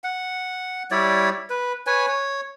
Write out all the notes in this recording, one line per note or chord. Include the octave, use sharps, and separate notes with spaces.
F#5
G3 E4 C#5 D5
B4
B4 C#5 G#5
C#5